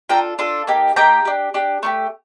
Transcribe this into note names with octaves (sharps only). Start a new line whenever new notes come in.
D4 F4 A4 G5 A#5
D4 F4 A4
A#3 D#4 G4
A#3 D#4 G4 G5 A#5
D4 G4
D4 G4
A3 D4 G4